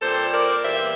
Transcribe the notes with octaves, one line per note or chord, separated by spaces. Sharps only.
A#2 G3 C4 A4 C5
A#4 D5
E2 E3 G3 A#3 C5 E5